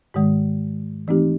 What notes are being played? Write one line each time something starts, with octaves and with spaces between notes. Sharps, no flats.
G#2 D#3 G#3
E3 A3 C4 D#4 G4